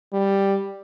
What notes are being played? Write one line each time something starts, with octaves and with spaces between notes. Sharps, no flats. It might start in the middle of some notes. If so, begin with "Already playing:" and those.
G3